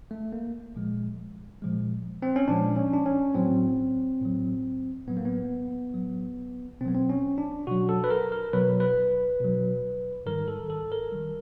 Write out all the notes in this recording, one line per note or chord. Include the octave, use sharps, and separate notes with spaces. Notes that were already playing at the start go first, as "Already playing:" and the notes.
A3
A#3
A#2 F3 G#3
A#2 F3 G#3
C4
C#4
A#2 F3 G#3 D4
C#4
D4
C#4
A2 F#3 C4
A2 F#3
A2 F#3 B3
A#3
B3
A2 F#3
B2 F#3 B3 C4
C4
C#4
D4
B2 F#3 F#4
A4
B4
A#4
A#4
B2 F#3 B4
B4
B2 F#3
G#2 D#3 G3 A#4
A4
A4
A#4
D#3 G3